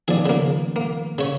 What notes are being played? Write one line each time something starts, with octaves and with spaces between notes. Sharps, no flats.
D#3 F3 B3 G#4 D5
C#3 A#3
A#3
C#3 C#5